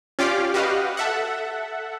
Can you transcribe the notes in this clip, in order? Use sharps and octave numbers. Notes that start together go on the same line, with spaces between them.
C#4 F4 G4 D5 F5 D6
F#4 G4 B4 D#5 F5
A4 E5 F#5